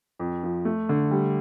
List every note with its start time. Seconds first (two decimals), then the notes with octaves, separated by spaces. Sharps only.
0.20 F2
0.43 F3
0.65 A3
0.89 D3
1.11 G3